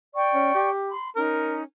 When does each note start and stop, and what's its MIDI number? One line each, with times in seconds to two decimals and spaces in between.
0.14 0.70 74
0.14 0.70 79
0.14 0.70 85
0.34 0.53 61
0.54 0.92 67
0.90 1.09 83
0.90 1.09 84
1.16 1.63 61
1.16 1.63 63
1.16 1.57 70